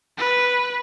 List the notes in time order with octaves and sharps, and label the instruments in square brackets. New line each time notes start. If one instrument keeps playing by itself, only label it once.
[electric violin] B4